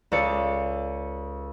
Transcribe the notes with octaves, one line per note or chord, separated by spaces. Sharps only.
C#2 A4 D5 C#7